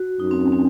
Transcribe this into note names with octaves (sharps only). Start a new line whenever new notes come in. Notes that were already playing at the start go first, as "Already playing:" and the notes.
Already playing: F#4
F#2 D#4
C4
C#4
C4